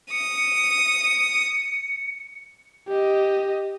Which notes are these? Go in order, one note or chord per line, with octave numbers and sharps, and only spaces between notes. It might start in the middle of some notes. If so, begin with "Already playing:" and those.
D#6 C#7
G4 D#5